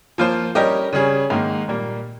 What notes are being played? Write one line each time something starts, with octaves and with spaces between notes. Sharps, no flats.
F3 A#3 F4 C5
G3 C#4 G4 A#4 D#5
C#3 G3 C#4 G#4
G#2 D#3 A#3
A#2 G3 A#3